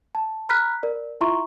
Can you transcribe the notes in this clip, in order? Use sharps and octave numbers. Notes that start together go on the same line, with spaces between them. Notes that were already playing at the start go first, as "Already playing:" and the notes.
A5
A#5 B5 F6 F#6 B6
A#4 D5
E4 F4 E5 A#5 C6 C#6